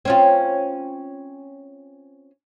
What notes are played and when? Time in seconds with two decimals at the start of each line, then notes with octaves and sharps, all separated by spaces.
0.05 C4 C#4 F4